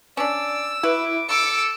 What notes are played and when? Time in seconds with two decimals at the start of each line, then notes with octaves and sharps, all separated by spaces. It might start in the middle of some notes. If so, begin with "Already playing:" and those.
0.17 C#4 D4 D5 E6
0.83 E4 F#4 B4 D6
1.29 A4 D6 E6 C#7